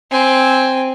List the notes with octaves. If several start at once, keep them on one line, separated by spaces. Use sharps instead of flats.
C4 G#5